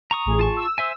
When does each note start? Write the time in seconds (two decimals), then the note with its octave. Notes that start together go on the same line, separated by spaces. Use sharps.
0.11 A#5 C#6 D#6
0.25 A1 A2 G#4
0.39 F4 A5 C#6
0.57 E6
0.78 C5 E5 G#5